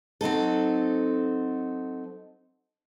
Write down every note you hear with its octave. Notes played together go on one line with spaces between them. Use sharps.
F#3 C4 D#4 A4